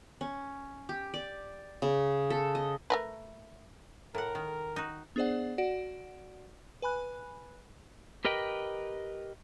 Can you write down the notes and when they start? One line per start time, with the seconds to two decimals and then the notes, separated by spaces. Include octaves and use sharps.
0.21 C#4
0.89 G4
1.14 D5
1.82 C#3
2.30 A4
2.55 D#5
2.90 A3 A#4 B4
4.15 A2 A#4 F#5
4.35 D#3
4.76 D#4 F#4
5.16 B3 D4 G#4 C5 D5 F#5
5.58 F#4 D5 F#5 D7
6.82 B4 G#5 B5 F#6
8.25 G4 A#4 B4 D#5 G5